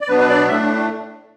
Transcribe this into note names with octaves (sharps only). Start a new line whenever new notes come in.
D5
B2 F#3 B3 D4 B4
B4
D5
A2 A3 D4 E5